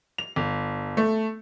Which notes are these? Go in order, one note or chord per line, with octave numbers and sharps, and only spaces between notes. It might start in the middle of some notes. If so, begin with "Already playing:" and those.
F7
G1
A3